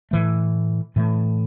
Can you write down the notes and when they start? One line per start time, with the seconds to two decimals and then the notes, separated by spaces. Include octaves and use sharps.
0.11 A2 E3 A3
0.96 A2 E3 A3